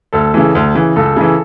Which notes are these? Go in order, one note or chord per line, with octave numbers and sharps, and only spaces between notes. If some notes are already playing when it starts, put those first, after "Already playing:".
D2 A4
C#3 E3
D2
C#3 E3
C#2 A4
C#3 E3